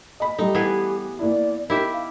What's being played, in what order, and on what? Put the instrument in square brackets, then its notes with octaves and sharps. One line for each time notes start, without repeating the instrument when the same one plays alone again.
[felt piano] D#5 B5
[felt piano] G3 A3 [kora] D#4 [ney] G4
[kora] E3 B3 G#4
[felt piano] A#3 E4 [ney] D5
[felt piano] D#4 [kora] E4 G4 E5 [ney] A#4
[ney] F5